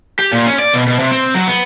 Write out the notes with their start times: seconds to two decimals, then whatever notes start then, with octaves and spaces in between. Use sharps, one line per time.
0.19 G4
0.33 A#2
0.47 C#4
0.59 D5
0.74 B2
0.88 B2
0.99 C3
1.12 C4
1.35 F#3
1.47 B3